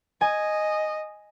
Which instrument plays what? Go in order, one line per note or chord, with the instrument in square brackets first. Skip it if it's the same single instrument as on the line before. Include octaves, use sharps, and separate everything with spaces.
[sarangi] D#5 [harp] G#5